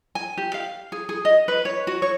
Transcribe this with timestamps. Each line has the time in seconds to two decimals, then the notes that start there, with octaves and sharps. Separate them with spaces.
0.15 G#5
0.37 G4
0.54 F5
0.92 G#4
1.09 G#4
1.25 D#5
1.48 B4
1.65 C#5
1.87 F#4
2.02 C#5